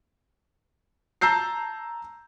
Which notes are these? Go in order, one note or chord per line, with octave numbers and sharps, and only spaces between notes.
A5 A#5 E6 G6 C7